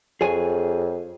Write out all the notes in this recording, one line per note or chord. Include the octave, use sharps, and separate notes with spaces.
F2 G#4 C#5 G#5